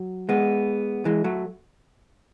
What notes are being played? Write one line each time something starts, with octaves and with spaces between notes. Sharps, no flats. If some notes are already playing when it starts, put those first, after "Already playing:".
Already playing: F#3
G#3 B3
E3 G#3
F#3 A3